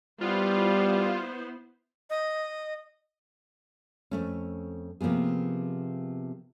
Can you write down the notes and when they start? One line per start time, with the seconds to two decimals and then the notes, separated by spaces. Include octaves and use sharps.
0.21 G3 B3 E4 F4 C5
2.10 D#5
4.11 F2 A3 C#4
5.01 C3 F3 A#3 B3 G#4